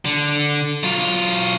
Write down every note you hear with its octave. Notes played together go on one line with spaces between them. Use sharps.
D3
F#3 F4